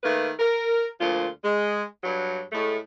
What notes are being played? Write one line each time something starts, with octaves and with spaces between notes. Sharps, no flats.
D#3 A3 A#3 B4
A#4
D2 A#2 F3 F4
G#3
G2 F#3
A2 G#3 A3